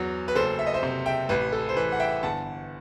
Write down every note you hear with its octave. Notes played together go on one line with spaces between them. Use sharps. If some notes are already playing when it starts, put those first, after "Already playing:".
Already playing: E2 F#3
B4
F#1 A4 C5
E5
D#5
C5 E5
C3
E5 G5
A1 B4
A4
C5
E3 B4
F#5
E5 G5
G1 F#5 A5